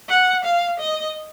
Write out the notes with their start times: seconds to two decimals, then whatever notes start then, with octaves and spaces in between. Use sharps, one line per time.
0.09 F#5
0.44 F5
0.79 D#5